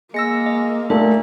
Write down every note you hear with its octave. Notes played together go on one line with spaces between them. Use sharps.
G#3 A#3 E6 A#6 C#7
D#5
A#2 A3 E5